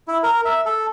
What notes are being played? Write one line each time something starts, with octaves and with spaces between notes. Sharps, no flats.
E4
A#4
E5
A4